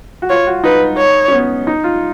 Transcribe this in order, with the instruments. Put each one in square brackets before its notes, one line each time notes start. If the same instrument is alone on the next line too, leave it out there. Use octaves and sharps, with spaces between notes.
[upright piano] F#4
[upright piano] F4 [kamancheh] C#5
[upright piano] F#4
[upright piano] D#4 [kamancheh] B4
[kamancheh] C#5
[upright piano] C#4
B3
D#4
F4